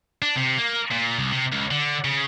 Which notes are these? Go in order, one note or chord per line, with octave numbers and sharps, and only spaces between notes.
D4
C3
A#3
A#2
C2
C3
C#2
D3
C#3